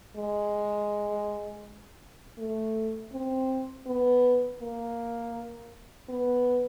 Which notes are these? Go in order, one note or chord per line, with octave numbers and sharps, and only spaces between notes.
G#3
A3
C4
B3
A#3
B3